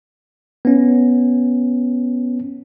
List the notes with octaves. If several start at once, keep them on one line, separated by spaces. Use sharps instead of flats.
B3 C#4